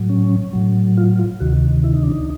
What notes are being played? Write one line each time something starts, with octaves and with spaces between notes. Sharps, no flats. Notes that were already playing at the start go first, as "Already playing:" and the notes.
Already playing: A2 F#3
C#4
A2 F#3
F4
F4
D2 C3 D#3 F#4
E4
D#4
D4
D#4